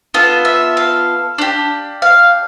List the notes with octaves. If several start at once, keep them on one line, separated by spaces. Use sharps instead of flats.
B3 F4 A4
E5
F5
D4 G4
F5